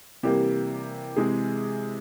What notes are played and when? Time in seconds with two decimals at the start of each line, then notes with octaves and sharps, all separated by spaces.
0.23 C3 E3 G3 A#3 G4
1.16 C3 E3 G#3 G#4